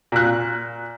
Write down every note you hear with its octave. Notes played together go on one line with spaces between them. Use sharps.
A#2 F#6